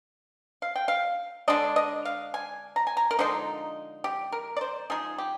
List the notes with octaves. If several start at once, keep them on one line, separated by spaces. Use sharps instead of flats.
F5
G5
F5
D3 G#3 D4 D#5
D#5
F5
G#5
A#5
G#5
A#5
A#4
D3 F3 G#3 D#4 C5
G4
A#4
D5
C5
F3 G#3 D#4 G#4
G4